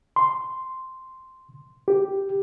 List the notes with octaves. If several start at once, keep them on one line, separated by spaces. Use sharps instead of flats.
C6
G4